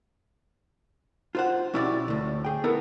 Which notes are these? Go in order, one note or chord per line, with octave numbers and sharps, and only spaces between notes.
F4 C5 F#5
B1 C#4 E4 G4 D5
D2 A2
G#4 G5
B3 E4 A4 A#4